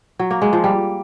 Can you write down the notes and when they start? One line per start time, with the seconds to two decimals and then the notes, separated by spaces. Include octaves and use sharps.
0.19 F#3
0.31 A#3
0.42 G#3
0.53 F3
0.64 G3